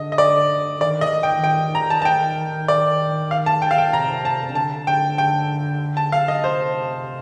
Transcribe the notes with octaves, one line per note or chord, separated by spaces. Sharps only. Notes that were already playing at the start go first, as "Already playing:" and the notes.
Already playing: D3 D#5
D#5
D5
D#3 D5
D#5
G5
D#3 G5
A#5
A5
A5
G5
D5
F5
A5
G5
F5
G5
C3 A#5
A5
D3 A5
G5
G5
A5
F5
D#5
C3 C5